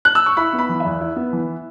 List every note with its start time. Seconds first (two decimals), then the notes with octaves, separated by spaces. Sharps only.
0.05 F#6
0.15 E6
0.26 C#6
0.37 E4 B5
0.53 B3
0.59 B5
0.69 E3
0.80 E2 E5
1.01 E4
1.16 B3
1.33 E3